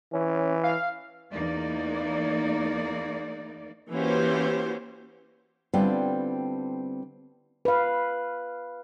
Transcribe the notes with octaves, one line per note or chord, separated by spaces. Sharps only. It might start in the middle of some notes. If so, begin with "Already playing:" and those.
E3 C#4
F5
E2 A#3 D#4 D5
E3 A#3 C#4 F#4 G4 C5
D3 G3 B3 C4 E4 F4
B4 F5